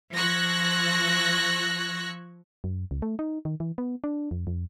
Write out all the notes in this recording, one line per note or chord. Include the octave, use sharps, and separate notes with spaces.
F3 C#6 E6 F#6 G#6 A#6
F#2
C#2
A3
D#4
D#3
E3
B3
D4
F2
F2